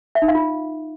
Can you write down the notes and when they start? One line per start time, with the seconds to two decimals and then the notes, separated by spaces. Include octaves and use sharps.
0.15 E5
0.22 D#4
0.28 F5
0.35 F4